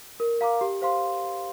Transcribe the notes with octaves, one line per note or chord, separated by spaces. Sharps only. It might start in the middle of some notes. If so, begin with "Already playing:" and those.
A#4
F5 A#5 D6
G4
C5 F5 C6